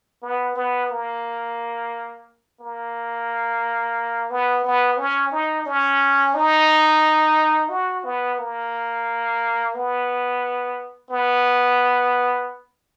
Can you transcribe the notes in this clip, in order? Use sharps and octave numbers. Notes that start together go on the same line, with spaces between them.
B3
B3
A#3
A#3
B3
B3
C#4
D#4
C#4
D#4
F#4
B3
A#3
B3
B3